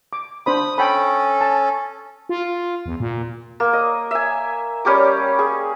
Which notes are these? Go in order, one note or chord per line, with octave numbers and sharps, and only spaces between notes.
D6
D4 C5 B5 D#6
C#4 A4 G5 B5
A5
F4
E2
A#2
A#3
D#5
E5 G#5
G3 C#4 G4 D6
G#4